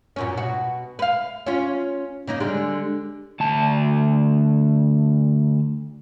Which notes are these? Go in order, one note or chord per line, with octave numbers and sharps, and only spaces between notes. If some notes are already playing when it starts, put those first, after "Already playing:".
F#2 A#2 C#4
B2 F#4
B4 F5
C#4 F4
C#3 A#3 D#4
D3 G3 G#3
D2 A5